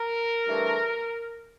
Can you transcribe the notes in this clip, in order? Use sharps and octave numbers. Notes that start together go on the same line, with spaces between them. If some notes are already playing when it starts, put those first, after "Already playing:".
Already playing: A#4
G2 E3 A3